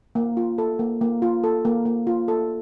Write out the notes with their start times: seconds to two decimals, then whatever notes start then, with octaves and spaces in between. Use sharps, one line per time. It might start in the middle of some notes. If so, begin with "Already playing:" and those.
0.15 A#3
0.37 F4
0.58 A4
0.79 A#3
1.01 A#3
1.22 F4
1.44 A4
1.65 A#3
1.85 A#3
2.07 F4
2.28 A4